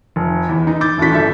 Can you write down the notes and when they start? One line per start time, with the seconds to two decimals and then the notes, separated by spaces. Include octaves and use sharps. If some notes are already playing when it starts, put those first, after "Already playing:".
0.16 F1
0.49 E2
0.67 D#4
0.81 D6 G6 A6
0.98 E1 A2 C#4 F#4 B6
1.11 G1 A4 E5